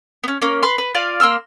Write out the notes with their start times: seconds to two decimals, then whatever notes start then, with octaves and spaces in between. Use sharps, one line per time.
0.24 B3 C#4
0.42 A#3 C#4
0.63 B4 B5 C6
0.78 B4
0.95 F4 D5 F5
1.20 A#3 C6 E6 F6